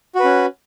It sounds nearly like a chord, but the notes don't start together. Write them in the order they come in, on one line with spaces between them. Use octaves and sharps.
F#4 B4 C#4